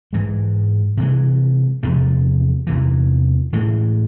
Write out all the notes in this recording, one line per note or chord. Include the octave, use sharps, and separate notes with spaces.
G#2 E3 G#3
C3 E3 G#3
E2 C3 F3 G#3
E2 C3 E3
A2 E3 G#3